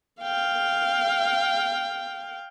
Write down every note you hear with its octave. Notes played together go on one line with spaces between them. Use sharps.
F5 G5